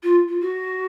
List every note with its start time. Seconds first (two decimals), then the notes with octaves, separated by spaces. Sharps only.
0.03 F4
0.29 F4
0.40 F#4